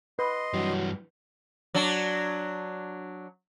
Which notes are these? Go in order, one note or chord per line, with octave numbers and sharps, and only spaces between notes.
B4 D#5 C6
G2 E3 F#3
F#3 D4